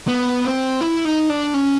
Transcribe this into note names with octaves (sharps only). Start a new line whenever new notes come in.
B3
C4
E4
D#4
D4
C#4